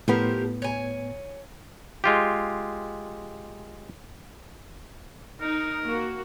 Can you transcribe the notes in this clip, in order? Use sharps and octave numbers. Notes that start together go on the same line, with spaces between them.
A2 F3 B3 G4 A#4
C#5 G#5
G#3 F4 G4
D#4 A#4
A#3 F#4